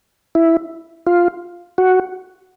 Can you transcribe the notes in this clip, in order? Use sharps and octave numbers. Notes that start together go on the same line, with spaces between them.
E4
F4
F#4